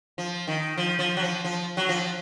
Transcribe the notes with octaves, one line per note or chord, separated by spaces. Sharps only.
F3
D#3
F3
F3
F#3
F3
F3
F#3
F3